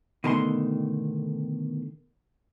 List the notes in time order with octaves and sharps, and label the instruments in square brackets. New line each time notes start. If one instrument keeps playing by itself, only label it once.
[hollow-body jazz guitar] B2 D3 D#3 A3 A#5 C6